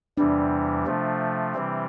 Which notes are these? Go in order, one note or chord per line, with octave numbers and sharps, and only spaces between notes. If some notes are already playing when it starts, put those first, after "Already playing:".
E2 C3 E3 G3 D4
C3 F3 A3
C3 E3 G3 C4